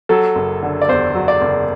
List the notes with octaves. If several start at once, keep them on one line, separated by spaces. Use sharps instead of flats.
F#3 A4
F#1
D3
D5
E2 C5
F#3
D5
F#1